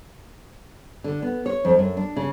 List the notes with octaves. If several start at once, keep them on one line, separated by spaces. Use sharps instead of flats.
D3
B3
C#5
F2
F#2
D4
C#3